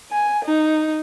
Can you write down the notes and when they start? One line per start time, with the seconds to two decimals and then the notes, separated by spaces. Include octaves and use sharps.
0.12 G#5
0.45 D#4